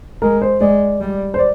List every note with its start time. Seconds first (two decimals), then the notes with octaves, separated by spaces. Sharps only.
0.22 G#3 A#4
0.42 C5
0.61 G#3 D5
1.01 G3
1.34 C5
1.39 D5